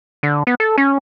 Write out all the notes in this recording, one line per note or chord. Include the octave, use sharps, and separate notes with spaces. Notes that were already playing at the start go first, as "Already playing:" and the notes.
D3
B3
A4
C#4